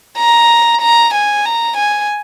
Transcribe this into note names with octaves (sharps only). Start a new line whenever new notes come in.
A#5
A#5
G#5
A#5
G#5